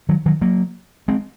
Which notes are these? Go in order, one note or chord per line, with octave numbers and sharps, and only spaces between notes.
D#3 F#3
D#3 F#3
F#3 A#3
G#3 C4